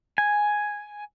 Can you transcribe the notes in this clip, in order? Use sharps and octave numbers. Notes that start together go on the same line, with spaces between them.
G#5